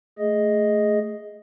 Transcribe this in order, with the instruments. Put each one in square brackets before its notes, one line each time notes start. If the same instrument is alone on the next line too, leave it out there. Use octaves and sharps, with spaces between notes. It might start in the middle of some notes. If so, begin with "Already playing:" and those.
[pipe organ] A3 G#4 D#5